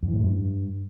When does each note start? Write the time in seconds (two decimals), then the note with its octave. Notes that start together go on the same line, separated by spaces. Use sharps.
0.03 F2
0.08 E3
0.14 A2
0.19 F#2
0.24 G2